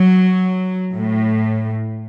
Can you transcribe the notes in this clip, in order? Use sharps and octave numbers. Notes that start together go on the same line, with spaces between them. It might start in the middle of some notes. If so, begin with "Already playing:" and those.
Already playing: F#3
A2